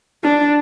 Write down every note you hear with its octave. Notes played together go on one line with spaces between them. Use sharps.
D4